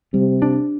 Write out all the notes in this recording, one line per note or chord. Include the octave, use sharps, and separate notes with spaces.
C3 G3
D4